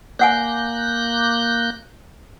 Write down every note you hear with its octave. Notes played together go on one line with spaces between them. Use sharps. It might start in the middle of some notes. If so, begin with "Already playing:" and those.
A#3 D5 F#5 G#5 F#6 G6